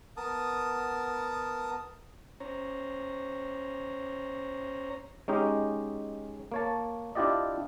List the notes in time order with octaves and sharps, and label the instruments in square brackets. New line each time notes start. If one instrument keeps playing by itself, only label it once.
[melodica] B3 A#4 A5 D#6
[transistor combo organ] C#4 C5 C#5 A#5
[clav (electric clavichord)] G#3 C#4 D#4 G4
A#3 C#5 A5
D4 E4 F4 G4 D5 D#5